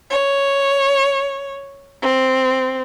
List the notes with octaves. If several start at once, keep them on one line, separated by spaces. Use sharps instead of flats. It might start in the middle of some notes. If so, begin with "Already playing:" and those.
C#5
C4